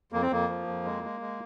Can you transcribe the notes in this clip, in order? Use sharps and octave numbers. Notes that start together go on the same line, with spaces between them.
F2 A#3
C4
F2 A#3
F3
F2
G#3
G#3
G#3